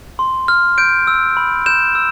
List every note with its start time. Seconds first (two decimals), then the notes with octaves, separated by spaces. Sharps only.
0.19 C6
0.48 F6
0.78 G6 D7
1.07 E6
1.37 B5
1.66 G6 E7
1.95 E6